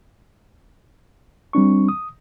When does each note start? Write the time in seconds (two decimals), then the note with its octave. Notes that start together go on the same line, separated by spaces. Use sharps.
1.53 G3 C4 D4 C#6
1.89 D#6